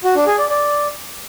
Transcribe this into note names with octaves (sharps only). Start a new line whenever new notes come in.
F#4
D4
G#4
D5
D5